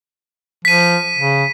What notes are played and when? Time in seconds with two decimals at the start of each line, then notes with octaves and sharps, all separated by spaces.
0.65 F3 B6 D#7
1.17 C#3